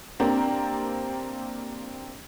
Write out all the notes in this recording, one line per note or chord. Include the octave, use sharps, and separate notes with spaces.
A#3 C4 D4 G4 A#5